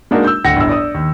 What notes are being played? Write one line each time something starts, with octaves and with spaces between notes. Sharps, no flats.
G#3 A#3 D4 D#4 F#4 A#4
E6 G6
D1 D3 F#5 G5 A#6 C#7
G1 A2 E6
D5 D#6
D#2